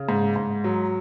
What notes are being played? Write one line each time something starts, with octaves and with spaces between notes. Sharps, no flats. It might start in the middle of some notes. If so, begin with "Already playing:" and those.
Already playing: C#3
G#2
G#2
F#3